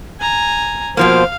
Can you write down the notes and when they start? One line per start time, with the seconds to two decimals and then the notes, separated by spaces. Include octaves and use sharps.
0.20 G#5 A#5
0.97 B2 F3 A#3 C5 F5